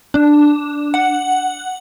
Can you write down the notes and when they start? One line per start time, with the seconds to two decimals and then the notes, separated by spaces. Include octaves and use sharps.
0.14 D4
0.94 F#5